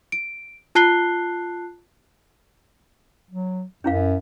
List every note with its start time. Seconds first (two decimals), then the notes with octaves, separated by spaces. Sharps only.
0.12 D7
0.75 F4 A5 F#6 C7 G7
3.31 F#3
3.84 F#2 C#4 E4 F5